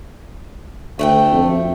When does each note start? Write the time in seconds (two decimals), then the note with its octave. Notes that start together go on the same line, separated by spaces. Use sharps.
0.99 D2 A3 F#5 G5
1.32 F2